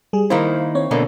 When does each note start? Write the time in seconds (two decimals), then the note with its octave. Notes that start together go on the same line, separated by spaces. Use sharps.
0.13 G3 G#4
0.30 D#3 A#3 E4 C5 F5
0.75 C4 C#5
0.91 B2 D3 A#3